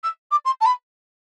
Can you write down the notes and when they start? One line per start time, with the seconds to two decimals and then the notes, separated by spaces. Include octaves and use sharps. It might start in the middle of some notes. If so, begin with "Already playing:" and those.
0.03 E6
0.31 D6
0.45 C6
0.61 A5
0.66 B5